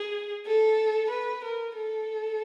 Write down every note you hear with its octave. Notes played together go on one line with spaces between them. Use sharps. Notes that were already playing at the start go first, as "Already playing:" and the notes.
Already playing: G#4
A4
B4
A#4
A4